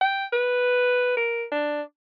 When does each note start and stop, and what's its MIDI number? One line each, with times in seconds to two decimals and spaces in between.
0.01 0.26 79
0.32 1.15 71
1.17 1.45 70
1.52 1.82 62